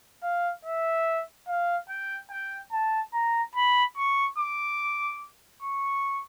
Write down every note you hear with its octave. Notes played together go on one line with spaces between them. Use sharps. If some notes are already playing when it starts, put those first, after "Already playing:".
F5
E5
F5
G5
G5
A5
A#5
B5
C#6
D6
C#6